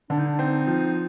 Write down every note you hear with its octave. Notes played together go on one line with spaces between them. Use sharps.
D3 D4
D#4
D4
C4 D#4
F3